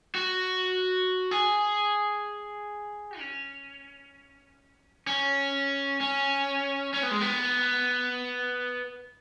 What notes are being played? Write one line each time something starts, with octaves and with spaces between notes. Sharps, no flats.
F#4
G#4
C#4
C#4
C#4
C#4
B3
G#3
B3